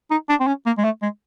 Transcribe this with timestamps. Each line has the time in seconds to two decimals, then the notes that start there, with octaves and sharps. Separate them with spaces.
0.11 D#4
0.29 D4
0.40 C4
0.47 C#4
0.66 A#3
0.78 G#3
0.84 A3
1.02 G#3